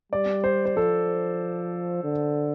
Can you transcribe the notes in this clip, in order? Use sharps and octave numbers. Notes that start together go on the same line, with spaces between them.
G3 D5
C5
C5
F3 A4
D3